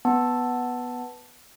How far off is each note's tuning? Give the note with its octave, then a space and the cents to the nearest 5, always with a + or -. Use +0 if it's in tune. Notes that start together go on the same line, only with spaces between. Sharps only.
B3 +0 A5 +0